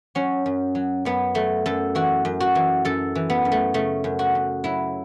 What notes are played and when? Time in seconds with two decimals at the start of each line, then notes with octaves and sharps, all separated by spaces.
0.15 F#3 C#4
0.46 F#2
0.75 F#3
1.05 F#2 B3
1.35 F#3 A3
1.66 F#2 A4
1.95 E3 F#4
2.25 F#2
2.40 F#4
2.55 E3
2.85 F#2 A4
3.15 E3
3.30 B3
3.45 F#2
3.52 A3
3.74 C#3 A3
4.04 F#2
4.19 F#4
4.35 F#2
4.64 F#3 E4